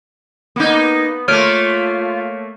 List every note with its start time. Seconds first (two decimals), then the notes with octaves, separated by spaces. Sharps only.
0.56 A#3 B3 D#4
1.28 A3 A#3 F4 C#5 F6 D7